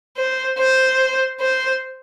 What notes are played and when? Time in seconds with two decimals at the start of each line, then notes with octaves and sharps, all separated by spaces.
0.17 C5
0.59 C5
1.40 C5